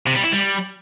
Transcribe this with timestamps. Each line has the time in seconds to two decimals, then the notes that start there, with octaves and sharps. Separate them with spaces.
0.06 C3
0.15 G3
0.23 E4
0.32 G3